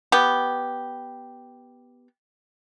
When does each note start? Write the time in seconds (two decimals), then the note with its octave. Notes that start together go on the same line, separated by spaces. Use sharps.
0.12 B3 G4